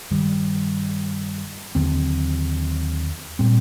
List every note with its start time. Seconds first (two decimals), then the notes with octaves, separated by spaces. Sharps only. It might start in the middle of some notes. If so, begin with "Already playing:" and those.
0.11 G2 D#3 G3
1.75 D#2 D3 F#3 C4
3.39 A#2 G3 C4